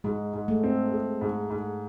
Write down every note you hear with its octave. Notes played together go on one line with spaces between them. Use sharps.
G#2 G#3
G#2
A3
C4
G#3
G#2
G#2